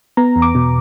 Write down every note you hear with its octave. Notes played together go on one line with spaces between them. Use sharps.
B3 A#5
E2
D6
B2